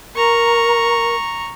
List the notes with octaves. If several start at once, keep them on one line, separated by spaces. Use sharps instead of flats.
A#4 A#5 C#6